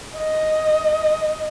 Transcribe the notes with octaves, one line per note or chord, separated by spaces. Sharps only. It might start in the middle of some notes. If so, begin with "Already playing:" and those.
D#5